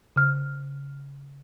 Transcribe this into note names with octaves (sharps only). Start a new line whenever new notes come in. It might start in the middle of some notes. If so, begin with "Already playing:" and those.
C#3 F6